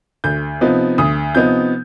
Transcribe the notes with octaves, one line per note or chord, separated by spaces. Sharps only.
D2 G6
C3 F3 B3 D#4
D2 D#6
C3 F3 B3 D#4 G6